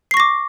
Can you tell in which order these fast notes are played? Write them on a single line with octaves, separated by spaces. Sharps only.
C7 C#6 A#6 D6